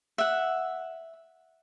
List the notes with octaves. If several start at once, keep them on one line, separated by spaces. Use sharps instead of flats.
E5 F#5